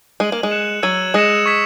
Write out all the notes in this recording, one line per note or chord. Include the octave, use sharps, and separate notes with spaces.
G#3 G#6 D#7 F#7
A#3
G#3
F#6 C#7 E7
F#3 E6 G#6 D#7 F#7
G#3 D#6 A#6 C#7 E7
C#6 G#6 B6 E7